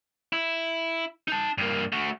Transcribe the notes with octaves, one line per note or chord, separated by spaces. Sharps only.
E4
D#4 A5
G2 A#3
A3 F#4